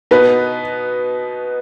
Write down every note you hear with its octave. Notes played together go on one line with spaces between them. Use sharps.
B2 B3 D#4 B4